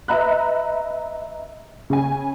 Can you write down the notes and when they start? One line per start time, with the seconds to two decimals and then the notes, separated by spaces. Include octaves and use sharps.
0.08 B4 D#5 E5 A#5 B5 F#6
1.90 C#3 C#4 G#5